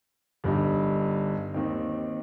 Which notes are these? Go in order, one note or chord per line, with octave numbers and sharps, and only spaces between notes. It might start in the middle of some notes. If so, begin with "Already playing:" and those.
G1 G2 G3 D#4
D#2 D#3 C4 D#4